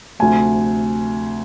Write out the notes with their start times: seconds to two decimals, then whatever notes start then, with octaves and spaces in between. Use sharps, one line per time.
0.19 D2 C3 F3 A3 G#5